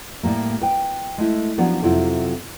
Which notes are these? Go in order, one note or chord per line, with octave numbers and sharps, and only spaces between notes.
A2 G3 A#3
B4 G5
G#3 A3 E4
F3 F#3 B3 C#4 D4
F2 C3 F#3 E4 F4